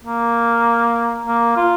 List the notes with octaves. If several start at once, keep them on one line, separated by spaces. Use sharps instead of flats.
A#3
A#3
F4